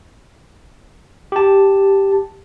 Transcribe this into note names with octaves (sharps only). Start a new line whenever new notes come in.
G4 A5